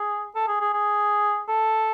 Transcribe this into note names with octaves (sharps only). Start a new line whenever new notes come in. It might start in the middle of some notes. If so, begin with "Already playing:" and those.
Already playing: G#4
A4
G#4
G#4
G#4
A4